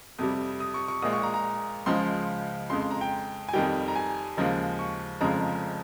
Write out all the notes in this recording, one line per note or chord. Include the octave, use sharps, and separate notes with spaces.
F2 C3 G3 D#6
D#6
C#6
C#6
A#1 A#2 G#3 D#6
C#6
A#5
A#5
C#2 C#3 F3 G#3 C6
F2 C#3 G#3 C6
C6
A#5
G5
G#5
F2 D#3 G3 G5
A#5
G#5
D#2 C#3 F3 G#3
C#6
F1 F2 C#3 F3 G#3 A#5